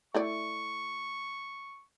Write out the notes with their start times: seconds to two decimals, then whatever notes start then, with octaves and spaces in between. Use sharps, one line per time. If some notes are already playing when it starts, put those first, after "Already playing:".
0.14 A3 E4 D5 C#6